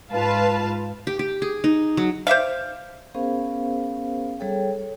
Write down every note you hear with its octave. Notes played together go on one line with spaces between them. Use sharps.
G#2 F4 B4 F5 A5
G4
G4
G#4
D#4
F#3
C5 D5 E5 F5
B3 C#4 G#4 A#4 C5 F5
G3 G#4 A4 C#5 G5
A4 C#5